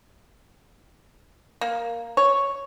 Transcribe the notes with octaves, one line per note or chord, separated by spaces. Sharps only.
A#3
C#5